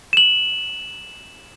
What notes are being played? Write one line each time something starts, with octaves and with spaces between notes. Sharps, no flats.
E7 F#7